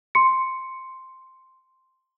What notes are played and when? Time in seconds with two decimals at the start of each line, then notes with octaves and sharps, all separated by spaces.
0.15 C6 C#7